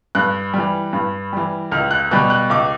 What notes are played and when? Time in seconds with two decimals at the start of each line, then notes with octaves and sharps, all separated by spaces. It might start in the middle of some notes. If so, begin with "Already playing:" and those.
0.15 G2 F#6
0.54 E3 G3
0.93 G2
1.33 E3 G3
1.71 C#2 F6
1.91 F#6
2.11 B2 G3 F#6
2.30 F#6
2.50 C#2 D6